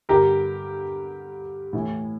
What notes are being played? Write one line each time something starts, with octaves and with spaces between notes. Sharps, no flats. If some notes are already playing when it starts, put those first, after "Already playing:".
G2 D3 G4 A#4
A2 E3